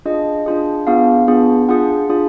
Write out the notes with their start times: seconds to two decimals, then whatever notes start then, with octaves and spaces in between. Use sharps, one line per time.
0.05 D4 F4 G#4 D#5
0.46 D4 F4 G#4
0.87 B3 D4 F4 G#4 F5
1.28 B3 D4 F4 G#4
1.69 D4 F4 G#4 F#5
2.09 D4 F4 G#4